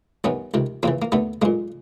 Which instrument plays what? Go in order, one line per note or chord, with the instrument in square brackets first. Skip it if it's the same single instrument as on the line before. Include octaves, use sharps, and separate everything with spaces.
[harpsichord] C2 C3 D#3 B3 C#4
C#2 C3 D#3
E2 C#3 E3 A#3 C4
A#3
D#2 D3 A3 B3
B1 A#2 G#3 A#3